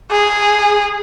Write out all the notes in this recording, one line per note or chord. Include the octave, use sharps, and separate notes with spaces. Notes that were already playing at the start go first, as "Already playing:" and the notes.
G#4